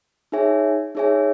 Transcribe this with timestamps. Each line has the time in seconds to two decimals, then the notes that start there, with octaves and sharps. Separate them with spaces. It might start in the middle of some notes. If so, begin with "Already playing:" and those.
0.32 D#4 G#4 C#5 E5 G#5
0.95 D#4 G#4 C#5 E5 G#5